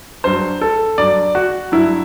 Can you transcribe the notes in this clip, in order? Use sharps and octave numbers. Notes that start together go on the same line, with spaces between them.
G2 F#3 C5
A4
G2 F#3 D5
F#4
G2 F#3 E4